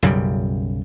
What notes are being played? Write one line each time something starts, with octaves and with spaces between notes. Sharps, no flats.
B1 F#2 C#3 G3